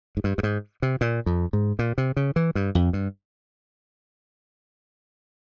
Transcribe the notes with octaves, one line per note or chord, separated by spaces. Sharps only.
G#2
G2
G2
G#2
C3
A#2
F2
G#2
A#2
C3
C#3
E3
G2
F2
G2